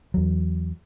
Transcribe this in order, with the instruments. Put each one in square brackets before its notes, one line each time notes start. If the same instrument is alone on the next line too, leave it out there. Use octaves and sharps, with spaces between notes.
[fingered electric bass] E2 F#3